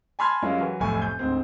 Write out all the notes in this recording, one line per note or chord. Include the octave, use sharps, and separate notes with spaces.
G#5 A5 B5 C6 F6 G#6
F#2 G3 G#3 C#4 F4
E3 F#3
F1 B1 F2 A2 G#5 C#6
G6
D2 G#2 C4